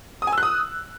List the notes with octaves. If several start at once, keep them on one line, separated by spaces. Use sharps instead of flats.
D#6
G#5
E6
F#6
D#6